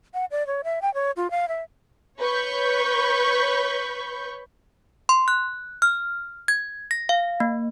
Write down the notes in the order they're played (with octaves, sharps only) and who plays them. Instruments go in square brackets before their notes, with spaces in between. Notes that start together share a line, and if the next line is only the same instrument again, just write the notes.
[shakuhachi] F#5
D5
C#5
E5
G5
C#5
F4
F5
E5
[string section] B4 C#5 B5 C#6 G6
[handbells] C6
F#6
F6
G#6
A#6
F5
A#3